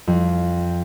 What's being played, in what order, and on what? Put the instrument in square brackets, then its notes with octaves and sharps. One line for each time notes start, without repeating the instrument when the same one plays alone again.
[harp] F2